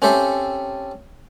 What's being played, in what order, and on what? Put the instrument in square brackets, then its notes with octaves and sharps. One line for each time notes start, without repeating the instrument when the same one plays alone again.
[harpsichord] C4 C#4 G4 A4 C5 E5